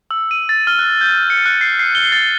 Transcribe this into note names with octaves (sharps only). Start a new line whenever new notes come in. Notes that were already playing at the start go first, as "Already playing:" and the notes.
E6
D#7
A6
F6
F#6
G6
C#7
F#6
C7
C7
G7
A6